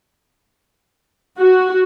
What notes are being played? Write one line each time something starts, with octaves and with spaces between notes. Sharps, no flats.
F#4